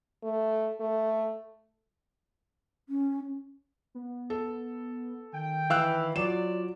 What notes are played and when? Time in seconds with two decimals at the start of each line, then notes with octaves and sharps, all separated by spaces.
0.23 A3
0.80 A3
2.89 C#4
3.95 B3
4.30 A4
5.33 D#3 G5
5.70 E3 F5 E6 F#6
6.16 F#3 F4 D5 E7